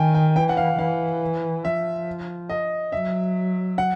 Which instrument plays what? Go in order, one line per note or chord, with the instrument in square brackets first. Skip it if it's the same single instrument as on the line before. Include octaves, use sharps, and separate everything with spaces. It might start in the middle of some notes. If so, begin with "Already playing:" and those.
Already playing: [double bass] D#3 [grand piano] G5 G#5
[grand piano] G5
[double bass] E3 [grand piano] G5
[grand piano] F#5
F5
[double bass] E3 [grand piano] F5
[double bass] F3 [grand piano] E5
[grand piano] D#5
[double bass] F#3 [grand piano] E5
[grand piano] F#5